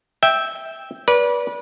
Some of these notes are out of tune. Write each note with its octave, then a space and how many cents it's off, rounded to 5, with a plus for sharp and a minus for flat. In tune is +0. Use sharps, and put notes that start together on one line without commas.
E5 -10 G5 +5
B4 -30 D5 -25